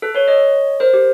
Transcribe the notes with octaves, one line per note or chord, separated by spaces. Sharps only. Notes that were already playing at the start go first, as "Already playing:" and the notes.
A4 B4
B4 C#5
C#5 D#5
A#4 C5
G4